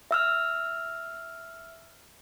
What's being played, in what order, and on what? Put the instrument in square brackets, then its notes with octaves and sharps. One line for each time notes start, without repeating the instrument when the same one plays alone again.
[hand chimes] E5 E6 F6